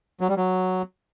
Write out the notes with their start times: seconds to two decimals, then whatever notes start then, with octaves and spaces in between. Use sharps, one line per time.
0.21 F#3
0.29 G3
0.37 F#3